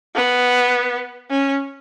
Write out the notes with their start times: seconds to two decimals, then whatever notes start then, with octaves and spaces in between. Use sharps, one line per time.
0.15 B3
1.31 C#4